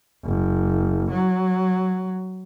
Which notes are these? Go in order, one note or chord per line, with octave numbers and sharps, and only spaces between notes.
F#1
F#3